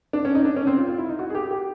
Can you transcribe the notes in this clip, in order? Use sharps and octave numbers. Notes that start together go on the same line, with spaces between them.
D4
C#4
D#4
D4
C#4
C4
F4
F4
E4
D#4
F#4
G#4
G4
G4